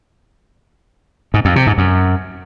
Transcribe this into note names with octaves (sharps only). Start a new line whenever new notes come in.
G#2
F2
C3
G#2
F#2